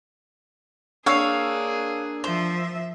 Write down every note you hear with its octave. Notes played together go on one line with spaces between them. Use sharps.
A#3 D4 G#4 C#5 F5 E6 C7
F3 C5 E5